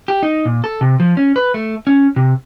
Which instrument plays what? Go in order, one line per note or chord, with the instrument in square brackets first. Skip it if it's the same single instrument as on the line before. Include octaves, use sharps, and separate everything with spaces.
[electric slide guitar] G4
D#4
A#2
A4
C3
F3
C#4
B4
A3
C#4
C3